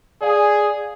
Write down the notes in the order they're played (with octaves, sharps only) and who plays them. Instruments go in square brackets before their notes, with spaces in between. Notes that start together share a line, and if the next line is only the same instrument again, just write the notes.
[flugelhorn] G#4 [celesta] D5 F5 G#5